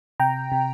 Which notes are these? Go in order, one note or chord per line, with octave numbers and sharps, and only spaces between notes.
C3 G5 A#5
C3